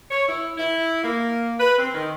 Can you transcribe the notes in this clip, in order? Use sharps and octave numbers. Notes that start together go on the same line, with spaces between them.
C#5
E4
E4
A#3
B4
C4
D#3